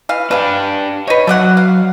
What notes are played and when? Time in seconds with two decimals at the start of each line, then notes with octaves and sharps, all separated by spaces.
0.09 E3 F5
0.31 D4 G4 B4 F5
1.07 D#4 B4 C#5
1.27 F#3 A3 D5 F#5
1.57 F5